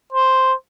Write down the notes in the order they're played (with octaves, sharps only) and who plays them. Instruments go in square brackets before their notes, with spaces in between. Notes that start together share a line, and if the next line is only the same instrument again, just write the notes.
[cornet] C5